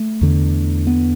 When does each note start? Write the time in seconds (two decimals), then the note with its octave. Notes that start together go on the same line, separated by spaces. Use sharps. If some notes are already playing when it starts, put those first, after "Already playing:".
Already playing: A3
0.21 E2 D3
0.87 B3